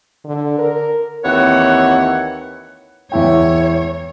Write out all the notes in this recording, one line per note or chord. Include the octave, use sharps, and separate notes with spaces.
D3
A#4
D#2 E3 C4 C#5 F#5
E2 E4 C#5 G5